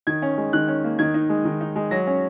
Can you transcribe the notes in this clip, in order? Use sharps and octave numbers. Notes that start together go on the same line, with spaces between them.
D#3 G#6
C#4
G#3
D#3 F#6
C#4
A#3
D#3 G#6
D#4
G#3
D#3
D#4
G#3
F#3 A#6
C#4